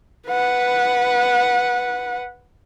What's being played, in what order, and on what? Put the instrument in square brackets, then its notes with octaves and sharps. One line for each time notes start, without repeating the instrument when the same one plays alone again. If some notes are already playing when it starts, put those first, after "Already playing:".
[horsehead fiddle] B4 F#5